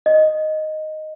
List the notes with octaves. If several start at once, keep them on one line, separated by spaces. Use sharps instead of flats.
D#5